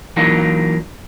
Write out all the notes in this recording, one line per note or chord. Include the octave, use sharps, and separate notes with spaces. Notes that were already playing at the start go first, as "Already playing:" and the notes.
E3 F#3 A#3 D4 D#4 F4